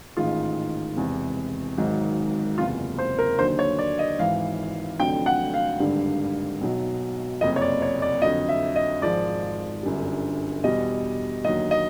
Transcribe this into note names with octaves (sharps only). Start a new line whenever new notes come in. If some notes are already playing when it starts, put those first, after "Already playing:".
A1 G#2 D#3 G#3 F4
E1 E2 C3
G#1 G#2 D#3 F#3
F#1 E2 C3 F4
C5
A#4
D#2 D3 F#3 C5
C#5
D5
D#5
G#1 G#2 E3 F5
F1 F2 D3 F#3 G5
F#5
F5
G#1 G2 D3 G3
B1 B2 F#3
F#1 F2 C3 D#5
C#5
D5
C#5
D5
F2 D3 F#3 D#5
E5
D#5
G#1 G#2 F3 G#3 D5
G1 F#2 D3 G3
E2 B2 G3 D#5
D#2 D3 F#3 D#5
D#5